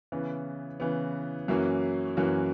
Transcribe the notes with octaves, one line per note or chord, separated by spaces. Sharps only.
C#3 E3 B3
C#3 E3 B3
F#2 E3 A#3 C#4 F#4
F#2 E3 A#3 C#4 F#4